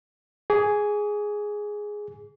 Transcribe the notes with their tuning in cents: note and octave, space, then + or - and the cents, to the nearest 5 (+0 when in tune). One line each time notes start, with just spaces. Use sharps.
G#4 +0 D6 -40